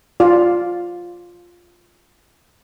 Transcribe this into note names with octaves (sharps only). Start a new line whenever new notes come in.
F4 D5